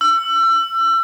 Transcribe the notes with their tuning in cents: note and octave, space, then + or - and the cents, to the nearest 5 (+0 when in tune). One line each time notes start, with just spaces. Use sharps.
E6 +30